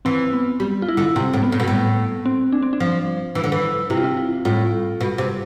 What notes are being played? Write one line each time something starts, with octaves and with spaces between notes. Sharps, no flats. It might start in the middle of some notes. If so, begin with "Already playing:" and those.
E3 C4
B3
G3
F4
E4
D3
C3 C4
A2
B3
A2
B2
A2
C4
D4
C4
D4
F3
E3
D3
E3
C3 E4
F4
E4
F4
A2 F4
B2
C3